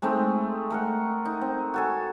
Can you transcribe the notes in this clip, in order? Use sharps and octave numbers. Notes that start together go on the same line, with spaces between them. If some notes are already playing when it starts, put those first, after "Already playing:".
G#3 A3 C4 D#4
A3 A#4 F#5
D#4
C4
F#4 A4 G#5